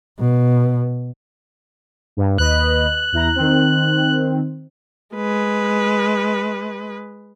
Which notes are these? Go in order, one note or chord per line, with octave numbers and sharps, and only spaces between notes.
B2
G2
D#2 B4 D#5 F#6
E2 E4 A#5
D#3 C4
G#3 B4